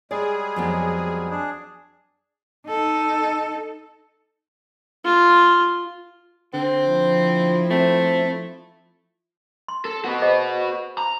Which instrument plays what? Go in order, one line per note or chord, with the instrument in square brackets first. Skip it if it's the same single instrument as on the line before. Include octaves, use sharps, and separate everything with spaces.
[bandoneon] G3 G#3 [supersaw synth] G#4 [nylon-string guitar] D5
[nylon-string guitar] F2 F#3 B3
[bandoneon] D4 G#4
[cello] D#4 A4
[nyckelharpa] F4
[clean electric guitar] D3 [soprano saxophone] C4
[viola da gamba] F3 E4
[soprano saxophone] A3 [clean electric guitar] C4
[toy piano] C6
[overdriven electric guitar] A4
F#4 B4
[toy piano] G#4 C5 D#5
[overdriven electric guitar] A#5